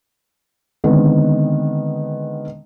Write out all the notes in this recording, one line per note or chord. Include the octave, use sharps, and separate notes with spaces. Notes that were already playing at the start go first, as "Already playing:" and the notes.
D3 D#3 G#3 B3 C4